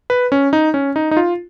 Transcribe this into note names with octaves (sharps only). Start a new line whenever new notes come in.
B4
C#4
D#4
C#4
D#4
D#4
F4